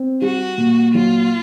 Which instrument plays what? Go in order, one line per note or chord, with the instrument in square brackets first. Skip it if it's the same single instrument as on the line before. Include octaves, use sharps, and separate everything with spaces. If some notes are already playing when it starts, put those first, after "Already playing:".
Already playing: [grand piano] C4
[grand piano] G3 [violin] F#4
[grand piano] A#2
[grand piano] F#3 [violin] F4